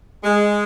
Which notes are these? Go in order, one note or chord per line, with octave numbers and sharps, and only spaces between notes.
G#3